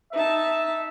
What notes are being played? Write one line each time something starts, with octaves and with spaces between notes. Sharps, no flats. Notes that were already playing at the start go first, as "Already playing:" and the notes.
D#4 E5 A5